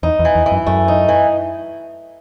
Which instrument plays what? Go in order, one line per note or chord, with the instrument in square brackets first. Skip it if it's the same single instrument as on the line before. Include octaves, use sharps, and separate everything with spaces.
[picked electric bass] E2 [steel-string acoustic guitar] D#4
[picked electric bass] E2
[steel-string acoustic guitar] E3
[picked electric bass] E2
[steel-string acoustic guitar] E3
[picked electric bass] F#2
[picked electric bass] F#2 [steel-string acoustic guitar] A3
[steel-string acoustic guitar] D#4
E3